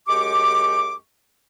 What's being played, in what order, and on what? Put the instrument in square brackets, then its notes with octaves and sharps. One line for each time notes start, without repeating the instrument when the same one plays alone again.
[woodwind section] F#2 G#3 G4 C#6 D6